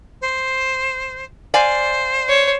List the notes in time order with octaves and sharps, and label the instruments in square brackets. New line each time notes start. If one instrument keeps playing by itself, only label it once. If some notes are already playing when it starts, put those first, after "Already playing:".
[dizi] C5
[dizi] C5 [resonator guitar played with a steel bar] D5 F5 G#5
[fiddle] C#5